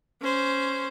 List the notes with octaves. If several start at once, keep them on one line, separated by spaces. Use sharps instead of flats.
C#4 C5